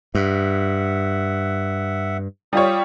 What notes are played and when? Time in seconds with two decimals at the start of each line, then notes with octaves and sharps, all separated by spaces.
0.15 G2 E5 F#5
2.53 G3 F4 C#5 D#6